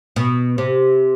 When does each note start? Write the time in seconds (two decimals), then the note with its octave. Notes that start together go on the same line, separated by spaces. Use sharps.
0.16 B2
0.58 C3